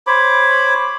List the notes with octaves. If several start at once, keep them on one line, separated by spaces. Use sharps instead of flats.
C5 C#5 B5 D6